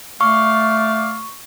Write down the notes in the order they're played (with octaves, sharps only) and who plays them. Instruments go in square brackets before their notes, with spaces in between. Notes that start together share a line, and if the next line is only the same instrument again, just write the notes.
[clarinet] A3 [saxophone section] D5 F5 [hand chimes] C#6